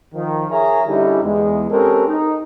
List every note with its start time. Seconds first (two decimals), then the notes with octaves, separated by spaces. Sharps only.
0.15 D#3 F3
0.50 G#4 A#4 C#5 E5 G#5 A#5
0.87 D3 G3 C#4 D#4 E4 G4
1.24 E2 G#3
1.71 G#3 C4 C#4 G4 A4 A#4
2.08 D#4